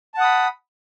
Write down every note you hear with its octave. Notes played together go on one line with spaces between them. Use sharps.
F#5 A5 B5 D#6